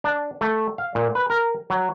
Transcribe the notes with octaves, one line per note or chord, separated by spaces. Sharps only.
D4
A3
F5
A#2
B4
A#4
F#3